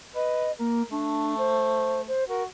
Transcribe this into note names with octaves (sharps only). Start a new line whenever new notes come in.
B4 D#5
A#3 A#4
A3 D4
C5
C5
F#4 A#4